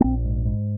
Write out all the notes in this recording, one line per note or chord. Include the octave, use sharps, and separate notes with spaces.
A#3
A#1 C4
G#2
G#2